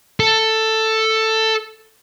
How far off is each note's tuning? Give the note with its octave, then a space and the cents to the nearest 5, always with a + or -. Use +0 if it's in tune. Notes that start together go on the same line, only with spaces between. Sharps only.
A4 +10